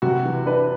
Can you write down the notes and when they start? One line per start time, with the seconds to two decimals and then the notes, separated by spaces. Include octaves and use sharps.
0.02 C3 F#4
0.25 E3
0.46 D4 B4